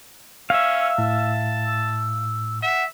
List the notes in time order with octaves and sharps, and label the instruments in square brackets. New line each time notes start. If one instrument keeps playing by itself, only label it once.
[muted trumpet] C#4 [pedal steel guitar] E5 F5 [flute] E6
[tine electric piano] A2 [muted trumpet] A5
[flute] E6
[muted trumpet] E5 [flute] F#5